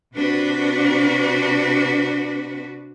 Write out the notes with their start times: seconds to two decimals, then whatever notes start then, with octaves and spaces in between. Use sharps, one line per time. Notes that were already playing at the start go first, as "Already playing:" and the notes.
0.14 C3 D4 F#4 B4